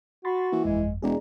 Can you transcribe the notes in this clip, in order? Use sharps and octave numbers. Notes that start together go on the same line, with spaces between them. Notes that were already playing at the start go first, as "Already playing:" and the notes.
F#4 B5 C6 A6
E3 A#3
G1 F2 G#3
E1 G#3 G#4 D5 A#5